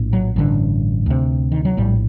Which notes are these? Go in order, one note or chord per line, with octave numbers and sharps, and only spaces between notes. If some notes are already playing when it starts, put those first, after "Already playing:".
Already playing: A#1 A2
F#3
A1 G2 D3
D2 C3
D#3
F#3
A#1 A2 G3